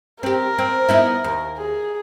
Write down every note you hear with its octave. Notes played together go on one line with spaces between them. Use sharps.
C4 G4 A#4
C4
B3 D#4 E4
D#2
G#4